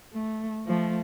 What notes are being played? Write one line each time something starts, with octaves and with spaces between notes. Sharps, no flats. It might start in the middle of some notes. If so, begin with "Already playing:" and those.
A3
F3 A3